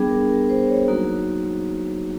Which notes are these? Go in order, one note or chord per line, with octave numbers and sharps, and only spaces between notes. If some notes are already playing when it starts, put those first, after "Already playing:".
Already playing: G3 B3 D4 G#4
A#4
A#4
C5
C#5
F#3 A#3 D#4 F#4